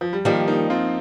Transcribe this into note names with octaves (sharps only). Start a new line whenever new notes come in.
F3
G3
D#3 F3 G3 A#3
A#3 D#4
C4 F4